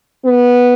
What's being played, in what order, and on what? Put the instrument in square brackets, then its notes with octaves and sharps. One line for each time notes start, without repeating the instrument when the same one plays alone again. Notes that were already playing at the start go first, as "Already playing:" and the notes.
[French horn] B3